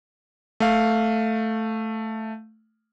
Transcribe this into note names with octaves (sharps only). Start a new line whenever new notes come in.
A3 F5